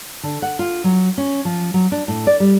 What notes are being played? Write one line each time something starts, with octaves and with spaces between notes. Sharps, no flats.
D3
F#5
F4
F#3
C#4
F3
F#3
D4
A2
D5
G3